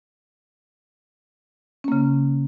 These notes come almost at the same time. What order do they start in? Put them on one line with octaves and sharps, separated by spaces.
C#4 A#3 C#3